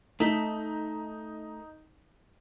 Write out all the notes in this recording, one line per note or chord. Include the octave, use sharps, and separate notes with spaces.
A3 D#4